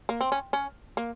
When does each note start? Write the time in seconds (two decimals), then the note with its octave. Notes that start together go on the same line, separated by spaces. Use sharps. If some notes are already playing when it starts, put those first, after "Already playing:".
0.09 A#3
0.21 C4
0.32 C#4
0.53 C#4
0.97 A#3